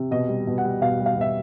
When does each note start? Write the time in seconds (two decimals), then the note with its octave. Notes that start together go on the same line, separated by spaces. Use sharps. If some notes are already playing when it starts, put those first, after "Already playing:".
Already playing: C3
0.11 B2 D#5
0.29 G3
0.47 B2
0.58 F#5
0.65 G3
0.82 B2 F5
1.00 G3
1.06 F5
1.16 B2 E5